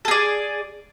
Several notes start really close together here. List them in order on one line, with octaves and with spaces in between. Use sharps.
A4 G#4 D5